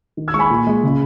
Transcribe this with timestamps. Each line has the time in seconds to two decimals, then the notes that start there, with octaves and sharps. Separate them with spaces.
0.17 D#3
0.28 E6 G#6
0.34 G#3 C#6
0.39 G#5 B5
0.50 A#2
0.67 G#3
0.84 C#3